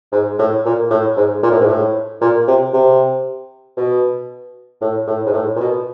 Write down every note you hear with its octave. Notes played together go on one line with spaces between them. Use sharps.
G#2
A2
A#2
A2
G#2
A#2
A2
G#2
A2
A#2
C3
C3
B2
A2
A2
G#2
A2
A#2
B2